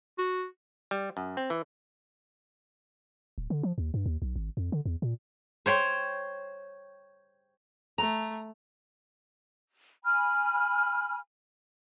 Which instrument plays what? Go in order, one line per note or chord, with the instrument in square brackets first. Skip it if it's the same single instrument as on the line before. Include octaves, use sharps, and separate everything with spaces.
[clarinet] F#4
[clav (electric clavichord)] G3
F#2
C4
E3
[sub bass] D1
D3
F3
D#2
G2
D#2
B1
G#1
F2
D3
E2
A#2
[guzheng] C5 C#5 G5 C6
[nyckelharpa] A3 [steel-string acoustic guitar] A#5
[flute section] G#5 B5 F6